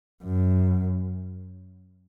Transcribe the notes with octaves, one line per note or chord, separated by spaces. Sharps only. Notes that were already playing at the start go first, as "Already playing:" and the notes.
F#2